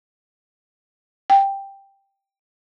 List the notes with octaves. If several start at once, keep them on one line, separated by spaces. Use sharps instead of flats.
G5